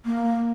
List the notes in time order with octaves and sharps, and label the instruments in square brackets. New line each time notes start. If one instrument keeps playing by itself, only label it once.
[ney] A#3